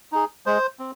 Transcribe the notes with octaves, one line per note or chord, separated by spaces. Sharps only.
D#4 G#4
G#3 C5
C4